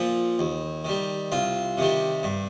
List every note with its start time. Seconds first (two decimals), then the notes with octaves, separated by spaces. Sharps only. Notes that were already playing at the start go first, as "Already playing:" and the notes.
Already playing: A#2 F3
0.39 D#2
0.85 D#3 G3
1.32 C2 F4
1.78 C3 D#3 G3
2.23 G2